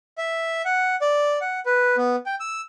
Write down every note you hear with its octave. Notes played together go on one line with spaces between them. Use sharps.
E5
F#5
D5
F#5
B4
B3
G5
E6